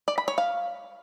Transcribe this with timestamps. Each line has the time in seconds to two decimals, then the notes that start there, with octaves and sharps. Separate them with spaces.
0.08 D5
0.18 B5
0.28 C#5
0.38 F5